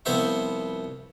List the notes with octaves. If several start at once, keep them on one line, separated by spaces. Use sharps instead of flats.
C2 F3 B3 C5 E5 C#6